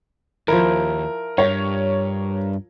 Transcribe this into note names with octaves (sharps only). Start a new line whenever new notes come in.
D#2 F3 E4 A#4
G2 C#5